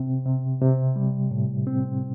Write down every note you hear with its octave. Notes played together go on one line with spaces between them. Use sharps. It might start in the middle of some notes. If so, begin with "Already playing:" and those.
Already playing: C3 C4
C3
C3
G3
A2
C4